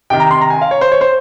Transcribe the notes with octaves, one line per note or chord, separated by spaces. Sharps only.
C3 D#3 G5
A#5
C6
A#5
G#5
F5
C#5
C5
C#5
C5